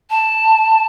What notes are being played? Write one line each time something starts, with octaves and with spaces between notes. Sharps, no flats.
A5